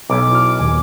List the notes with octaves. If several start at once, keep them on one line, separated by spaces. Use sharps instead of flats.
B1 D6
E4 F#4 F6
D#2 A#2 G#5